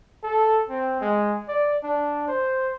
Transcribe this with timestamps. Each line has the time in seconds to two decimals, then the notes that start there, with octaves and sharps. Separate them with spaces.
0.23 A4
0.69 C4
1.01 G#3
1.48 D5
1.83 D4
2.28 C5